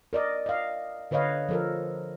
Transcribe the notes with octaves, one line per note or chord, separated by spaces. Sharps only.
A#4 D5 D#5
D#5 F5
D3 B4 C#5 D#5 F5
F3 A4 A#4